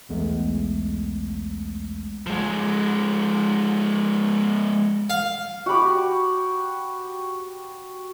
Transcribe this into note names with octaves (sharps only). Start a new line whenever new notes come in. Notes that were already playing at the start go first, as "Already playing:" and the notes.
B1 E2 G#3 A3
F3 G#3
F5
F#4 G4 B5 D6